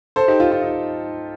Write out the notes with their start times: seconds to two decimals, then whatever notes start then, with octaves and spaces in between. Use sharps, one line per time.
0.16 A4 C5
0.28 D#4 G4
0.40 F4
0.51 F4
0.62 D#4